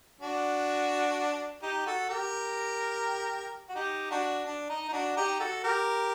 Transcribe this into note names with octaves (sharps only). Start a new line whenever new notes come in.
D4 F#4
D#4 G4
F#4 A4
G4 A#4
F#4
D#4 G4
D4 F#4
D4
D#4
D#4
D4 F#4
D#4 G4
F#4 A4
G4 A#4